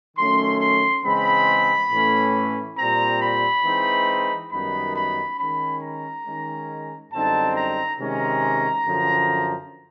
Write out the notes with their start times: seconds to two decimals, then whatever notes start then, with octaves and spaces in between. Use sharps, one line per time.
0.17 D#3 F#3 A3 C#4 C6
0.60 C6
1.04 C#3 E3 G#3 C4 B5
1.91 A2 E3 A3 C#4
2.78 A#2 G3 C4 A#5
3.21 B5
3.64 E3 G#3 C4 D#4
4.52 F#2 D#3 G3 B3 D#4 B5
4.95 B5
5.38 D#3 G#3 C#4 B5
5.82 A#5
6.26 D#3 G#3 C#4
7.12 F#2 D3 G3 C4 D#4 A5
7.55 A#5
8.00 C3 D#3 G#3 C#4 A#5
8.86 F#2 D3 F3